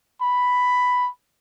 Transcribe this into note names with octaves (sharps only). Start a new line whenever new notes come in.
B5